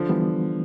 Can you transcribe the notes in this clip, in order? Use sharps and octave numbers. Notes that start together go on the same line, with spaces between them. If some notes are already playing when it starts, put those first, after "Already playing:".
Already playing: D3 F3
E3 G3 B3